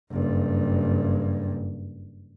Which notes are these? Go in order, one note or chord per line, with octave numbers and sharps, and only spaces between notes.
F#1 G2